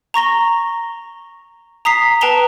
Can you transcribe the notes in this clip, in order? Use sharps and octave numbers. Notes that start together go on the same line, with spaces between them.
A#5 C#6 A#6 G7
A#5 D#6 B6 C7
B4 G5 A5 A#5 F7 G7